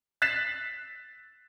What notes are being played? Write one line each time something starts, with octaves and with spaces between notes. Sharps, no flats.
F#6 A6 B6 C7 E7